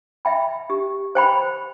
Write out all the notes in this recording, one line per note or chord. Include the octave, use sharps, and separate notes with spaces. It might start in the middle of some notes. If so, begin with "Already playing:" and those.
E5 G5 B5
G4
C5 G5 B5